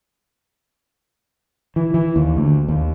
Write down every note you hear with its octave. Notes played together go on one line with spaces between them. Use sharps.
E3
E3
D#2
D2
D#2